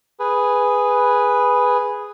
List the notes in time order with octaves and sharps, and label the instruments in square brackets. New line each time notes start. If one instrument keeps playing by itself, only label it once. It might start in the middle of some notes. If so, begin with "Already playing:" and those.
[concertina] G#4 B4